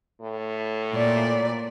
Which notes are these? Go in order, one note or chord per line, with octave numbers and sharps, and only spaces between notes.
A2
A#2 D5